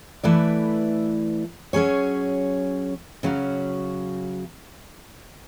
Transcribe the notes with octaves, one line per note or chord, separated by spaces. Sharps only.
E3 A3 E4 B4 D5
F#3 C#4 G#4 C#5
C#3 F#3 C#4 F#4